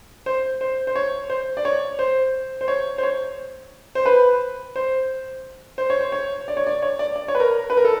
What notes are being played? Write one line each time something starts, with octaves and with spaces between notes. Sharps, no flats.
C5
C5
C5
C#5
C5
D5
C#5
C5
C5
C#5
C5
C#5
C5
B4
C5
C5
C#5
C5
C#5
D5
C#5
D5
C#5
D5
D5
C#5
B4
A#4
B4
A#4
A4